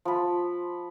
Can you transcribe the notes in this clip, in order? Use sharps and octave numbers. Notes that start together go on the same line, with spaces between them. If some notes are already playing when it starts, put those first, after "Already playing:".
F3 B5